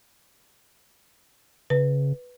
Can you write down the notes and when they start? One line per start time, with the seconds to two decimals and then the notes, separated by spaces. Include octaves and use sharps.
1.70 C#3 B4